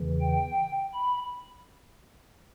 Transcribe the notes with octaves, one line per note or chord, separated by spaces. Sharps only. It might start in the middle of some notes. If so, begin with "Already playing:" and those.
Already playing: E2 C#3 E3
G5
B5